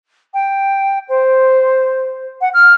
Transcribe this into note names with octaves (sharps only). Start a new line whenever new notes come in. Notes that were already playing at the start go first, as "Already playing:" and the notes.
G5
C5
F#5
F6